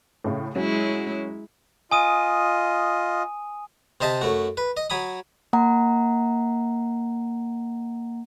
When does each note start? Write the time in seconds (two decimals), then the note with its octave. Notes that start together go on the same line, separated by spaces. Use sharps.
0.24 A2 C#3
0.55 F#3 G#3 C#4 E4
1.91 F4 D#5 G#5 D#6 D#7
4.01 C3 C5 D#5 E5 A5
4.21 F#2 A3 F#4
4.57 B4
4.77 D#5
4.90 F#3 G#5 B5 D#6
5.53 A#3 F#5 A#5